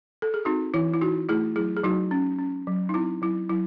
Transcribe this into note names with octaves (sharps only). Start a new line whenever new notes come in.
A4
G#4
C4 D#4 F#4
E3 E4
E4
E3 D#4 F#4
A3 E4 G#4
F#3 E4 G#4
G#4
F#3 D#4 F#4
C#4
C#4
F#3
D#4
C4 E4
F#3 E4
F#3 E4